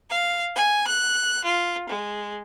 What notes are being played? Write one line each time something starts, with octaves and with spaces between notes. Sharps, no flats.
F5
G#5
F#6
F4
G#3